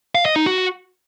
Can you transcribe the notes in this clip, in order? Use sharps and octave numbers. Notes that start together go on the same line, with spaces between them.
F5
D#5
D#4
F#4